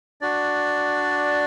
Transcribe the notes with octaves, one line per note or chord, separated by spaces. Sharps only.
D4 F#4 D5